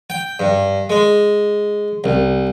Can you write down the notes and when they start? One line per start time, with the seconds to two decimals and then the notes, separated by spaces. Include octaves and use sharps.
0.10 G5
0.39 G2
0.90 G#3
2.04 C2